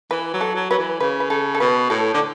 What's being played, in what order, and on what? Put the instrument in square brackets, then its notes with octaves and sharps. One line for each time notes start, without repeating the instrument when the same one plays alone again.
[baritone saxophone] E3 [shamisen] B4
[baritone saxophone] F#3
[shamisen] A4
[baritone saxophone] F#3
[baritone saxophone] F#3 [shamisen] B4
[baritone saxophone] E3
[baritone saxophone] C#3 [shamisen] B4
[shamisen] B4
[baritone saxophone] C#3 [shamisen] A4
[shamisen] A4
[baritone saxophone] B2 [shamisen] B4
[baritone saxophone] A2 [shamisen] A4
[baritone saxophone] D3